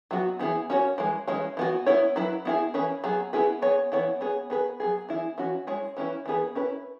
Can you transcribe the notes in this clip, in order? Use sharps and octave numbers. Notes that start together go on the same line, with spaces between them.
F#3 B3 F#4
E3 B3 E4 G#4
C#4 F#4 C#5
E3 G#3
E3 G#3 C#4
E3 B3 F#4
B3 E4 C#5
F#3 E4 B4
B3 E4 G#4
E3 C#4 G#4 B4
F#3 B3 G#4
B3 E4 G#4 B4
B3 G#4 C#5
E3 B3 E4 C#5
B3 G#4 C#5
B3 G#4 B4
F#3 B3 G#4
E3 B3 E4 G#4
E3 C#4 F#4
G#3 E4 G#4 C#5
E3 C#4 E4 B4
E3 B3 G#4 B4
C#4 E4 B4